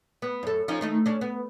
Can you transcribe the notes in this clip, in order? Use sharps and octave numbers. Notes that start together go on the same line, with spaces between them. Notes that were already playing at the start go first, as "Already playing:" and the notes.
B3
F#2 A4
F3 C#4 D#4
D#3 A3 D#4
C#4 D4
B3